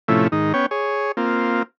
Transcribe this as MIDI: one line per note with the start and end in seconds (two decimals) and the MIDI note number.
0.08 0.28 45
0.08 0.28 48
0.08 0.28 53
0.08 0.28 57
0.08 0.28 61
0.08 0.28 64
0.32 0.53 44
0.32 0.53 51
0.32 0.53 63
0.54 0.66 59
0.54 0.66 61
0.54 0.66 73
0.54 0.66 79
0.71 1.12 68
0.71 1.12 73
1.17 1.63 58
1.17 1.63 60
1.17 1.63 65